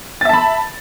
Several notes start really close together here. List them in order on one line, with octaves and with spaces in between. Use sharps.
A6 E5 A5 B5